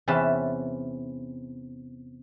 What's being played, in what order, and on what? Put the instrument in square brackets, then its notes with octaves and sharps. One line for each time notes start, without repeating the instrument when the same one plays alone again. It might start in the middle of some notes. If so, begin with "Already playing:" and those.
[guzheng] E2 C3 C#4 B4 E5 A5